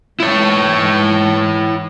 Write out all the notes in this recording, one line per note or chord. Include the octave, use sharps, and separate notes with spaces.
G#2 E3 E4 C#5